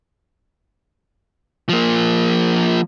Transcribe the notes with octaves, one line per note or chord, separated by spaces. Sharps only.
F3 A#3